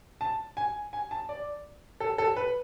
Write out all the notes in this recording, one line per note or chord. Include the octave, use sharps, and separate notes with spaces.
A5
G#5
G#5
A5
D5
A4
A4
B4